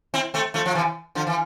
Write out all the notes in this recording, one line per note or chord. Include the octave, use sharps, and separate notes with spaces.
C4 E4
A3 C4
F3 A3
F3
C3 E3
D3 F3
E3